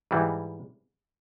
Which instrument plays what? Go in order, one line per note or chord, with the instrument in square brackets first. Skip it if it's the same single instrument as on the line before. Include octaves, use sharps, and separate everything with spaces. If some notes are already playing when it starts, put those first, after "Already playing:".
[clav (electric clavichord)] G#2 E3 G3